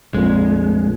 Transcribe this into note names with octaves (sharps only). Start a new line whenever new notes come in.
A#1 F2 A#2 G#3